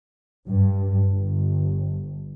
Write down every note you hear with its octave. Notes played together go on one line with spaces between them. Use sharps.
G2
G1